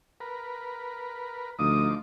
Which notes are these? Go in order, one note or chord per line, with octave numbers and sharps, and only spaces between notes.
A#4 B4
D2 F3 D#4 D6 D#6